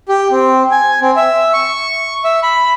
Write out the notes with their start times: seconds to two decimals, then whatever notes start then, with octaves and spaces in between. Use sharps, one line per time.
0.09 G4
0.31 C4
0.72 G#5
1.01 C4
1.16 E5
1.53 C#6
2.24 E5
2.43 B5